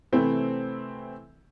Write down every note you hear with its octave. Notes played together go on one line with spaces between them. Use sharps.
C3 E3 A3 C4 E4